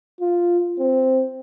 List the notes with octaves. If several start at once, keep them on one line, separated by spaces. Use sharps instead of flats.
F4
C4